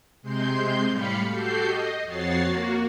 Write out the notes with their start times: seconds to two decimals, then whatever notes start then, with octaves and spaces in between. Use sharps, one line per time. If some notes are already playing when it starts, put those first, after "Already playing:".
0.22 C3 G#3 C6 G6
0.89 A2 G3 F5 B5 C#7
1.30 F#4 G4 A4 G6 C7
1.64 D#5
2.05 F2 F#4 C#5 A6 C7
2.43 A#3 F#4